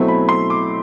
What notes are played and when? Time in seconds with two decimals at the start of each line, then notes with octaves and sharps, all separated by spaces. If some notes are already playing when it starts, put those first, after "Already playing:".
Already playing: B2 F#3 A3 C4 E4
0.08 B5
0.29 C6
0.50 D6